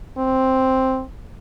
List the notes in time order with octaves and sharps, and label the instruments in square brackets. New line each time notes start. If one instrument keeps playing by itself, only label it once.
[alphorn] C4